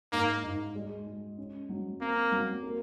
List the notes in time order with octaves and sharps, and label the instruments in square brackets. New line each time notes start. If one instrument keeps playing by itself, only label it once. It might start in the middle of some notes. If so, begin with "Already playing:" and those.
[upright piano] G#2 [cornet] A#3
[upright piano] G#2
G#3
G#3
C#4
F#3
[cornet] A#3 [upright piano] C4
[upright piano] F#3
A#3